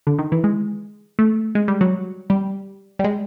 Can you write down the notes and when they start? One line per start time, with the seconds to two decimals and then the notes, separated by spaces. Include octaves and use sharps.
0.07 D3
0.19 D#3
0.32 E3
0.44 G#3
1.19 A3
1.55 G#3
1.68 G3
1.81 F#3
2.30 G3
2.99 G3
3.04 G#3